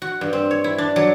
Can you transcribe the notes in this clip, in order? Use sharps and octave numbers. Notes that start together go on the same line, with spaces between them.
F#4
G2
C4
C#5
E4
D4
F#3